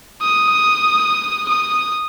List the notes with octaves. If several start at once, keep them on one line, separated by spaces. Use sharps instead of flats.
D#6
D#6